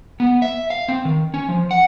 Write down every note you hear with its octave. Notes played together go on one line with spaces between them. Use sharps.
B3
E5
F5
C4
D#3
C#4
F3
F#5